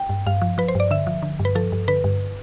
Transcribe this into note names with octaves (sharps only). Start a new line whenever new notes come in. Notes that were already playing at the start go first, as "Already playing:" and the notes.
Already playing: G5
G2
G2 F5
F3
F3 B4
C5
G2 D5
D3 E5
F3
D3
G2
B4
F3 A4
G2
D3 B4
G2